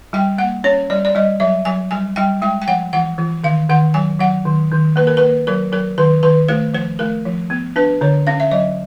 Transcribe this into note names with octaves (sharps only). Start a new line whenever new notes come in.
G3 G5
A#3 F#5
C#4 C#5
G3 D5
D5
G3 D#5
F#3 E5
F#3 G#5
G3 G#5
G3 G5
G#3 G5
G5
F3 F#5
E3 F#5
E3
D#3 F5
D#3 F#5
F#3 G#5
F#3 F#5
D#3
D#3
A#3 B4
A#4
B4
A#3
F#3 A#4
F#3 A#4
D#3 B4
D#3 B4
A3 C5
F3 C5
A3 A#4
F3
B3
D4 B4
D3 C#5
C#4 F5
E5
F#3 D#5